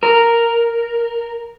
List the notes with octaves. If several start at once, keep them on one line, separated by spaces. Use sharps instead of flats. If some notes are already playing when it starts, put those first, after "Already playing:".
A#4